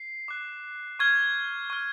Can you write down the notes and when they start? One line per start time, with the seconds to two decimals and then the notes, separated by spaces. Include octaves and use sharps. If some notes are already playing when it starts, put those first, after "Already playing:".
Already playing: C7
0.28 D6 F#6
0.99 C#6 F6 G#6
1.70 C#6 F6